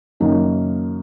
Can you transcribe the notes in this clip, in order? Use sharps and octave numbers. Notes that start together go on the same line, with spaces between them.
F#1 F#2 D#3 A#3 D#4